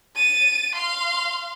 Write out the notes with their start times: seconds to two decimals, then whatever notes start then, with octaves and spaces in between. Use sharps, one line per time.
0.16 A6 D#7
0.75 F5 C6